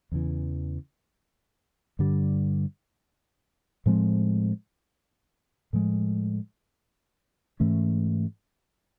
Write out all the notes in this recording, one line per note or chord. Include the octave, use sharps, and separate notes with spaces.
E2 C#3 E3
G2 D3 G3
A2 F3 G#3 C4
A2 F3 G#3
G#2 E3 A3 C#4